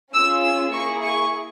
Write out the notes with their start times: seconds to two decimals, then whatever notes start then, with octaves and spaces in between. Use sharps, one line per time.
0.14 C#4 F4 G#4 E6
0.43 E6
0.73 A#3 E4 G#4 C#6
1.03 C#6